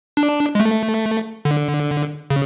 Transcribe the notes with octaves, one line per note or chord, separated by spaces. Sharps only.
D4
G#3
A3
D3
C#3